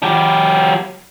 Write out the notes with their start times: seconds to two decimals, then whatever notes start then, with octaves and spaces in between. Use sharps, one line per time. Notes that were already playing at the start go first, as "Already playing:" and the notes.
0.03 F#3 G4